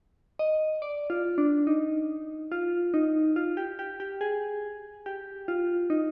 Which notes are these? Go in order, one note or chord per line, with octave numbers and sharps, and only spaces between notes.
D#5
D5
F4
D4
D#4
F4
D#4
F4
G4
G4
G4
G#4
G4
F4
D#4